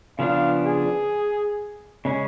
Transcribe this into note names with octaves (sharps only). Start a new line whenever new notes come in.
C#3 F3 B3 D4 F5
G#4
C#3 G#3 C#4 G#4